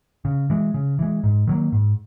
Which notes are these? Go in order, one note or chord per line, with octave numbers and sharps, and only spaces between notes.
C#3
E3 G#3
C#3
E3 G#3
G#2
D#3 F#3 A#3
G#2